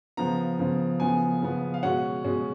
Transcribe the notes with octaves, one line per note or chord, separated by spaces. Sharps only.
C#3 F3 B3 A#5
C#3 F3 B3
C#3 F3 B3 G#5
C#3 F3 B3
F5
B2 G#3 C#4 F#5
B2 G#3 C#4